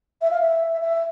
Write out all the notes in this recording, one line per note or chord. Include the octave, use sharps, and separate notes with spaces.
E5
F5
E5
E5